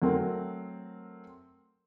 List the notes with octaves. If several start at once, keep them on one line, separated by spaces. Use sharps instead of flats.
F#3 A3 C4 A#4